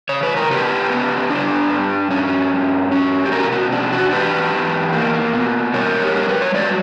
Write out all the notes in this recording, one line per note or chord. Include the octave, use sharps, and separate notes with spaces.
C#3 C#5
B4
A#4
C#3 G4 B4
B3
D4
G2
C#4
G2
C#4
G4
B2 F#4 A#4
F#4
D4
F#4
E2 G4 B4
E2
A#3
B2
G3 A#4 C#5
G4
G3 A#4
B4
C#5
F#3 B4 D5